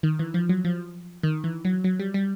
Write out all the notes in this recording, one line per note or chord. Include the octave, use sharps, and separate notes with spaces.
D#3
E3
F3
F#3
F3
D#3
E3
F#3
F#3
G3
G3